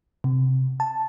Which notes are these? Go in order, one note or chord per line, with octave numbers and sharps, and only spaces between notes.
C3
A5